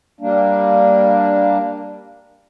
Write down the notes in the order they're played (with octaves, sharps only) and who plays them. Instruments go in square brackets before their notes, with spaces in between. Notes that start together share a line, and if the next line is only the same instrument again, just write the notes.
[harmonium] G3 A#3 D4